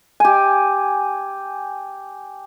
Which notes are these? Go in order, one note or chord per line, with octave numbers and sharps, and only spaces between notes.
G4 G#5